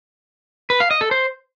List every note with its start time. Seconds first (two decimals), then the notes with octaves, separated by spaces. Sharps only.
0.70 B4
0.80 F5
0.91 D#5
1.01 A4
1.11 C5